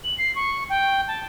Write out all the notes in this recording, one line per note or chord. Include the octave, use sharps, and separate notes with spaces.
F#7
C7
C#6
G5
A5